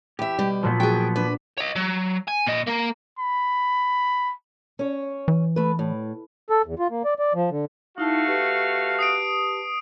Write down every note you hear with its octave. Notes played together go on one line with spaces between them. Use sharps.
E2 G4 E5
B2 G3
A#2 F3 F#3 A#3 B3
F#4 G#4 G5
D4 B4
C#5 D#5
F#3
G#5
A#2 D#5
A#3 A#4
B5
C#4 C#5
E3
A3 B4
A2
A4
E2
F4
A#3
D5
D5
F3
D3
A3 D#4 E4 F#4 F5 A5
G4 B4 A5
D#6 C7 D7